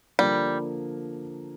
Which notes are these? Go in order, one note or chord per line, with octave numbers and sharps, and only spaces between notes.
D3 F3 G3 A#3